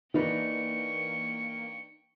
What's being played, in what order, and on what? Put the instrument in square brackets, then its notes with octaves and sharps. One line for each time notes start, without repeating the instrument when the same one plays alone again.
[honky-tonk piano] E3 [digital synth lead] A#3 [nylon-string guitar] D4 D#4 B4 [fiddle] G5 C#6